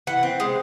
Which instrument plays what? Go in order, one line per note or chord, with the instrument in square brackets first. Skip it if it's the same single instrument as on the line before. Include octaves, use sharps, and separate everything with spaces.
[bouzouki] E3 F#5
C4
G#3